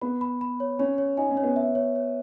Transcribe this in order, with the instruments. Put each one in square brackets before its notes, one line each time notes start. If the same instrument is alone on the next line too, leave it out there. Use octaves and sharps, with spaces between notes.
[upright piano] B3 [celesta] B5
[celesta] B5
B5
C#5
[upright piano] C#4 [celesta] C#5
[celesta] C#5
[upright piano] D#4 [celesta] G#5
[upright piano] C#4
[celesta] C#5
[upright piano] B3
[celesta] E5
C#5
C#5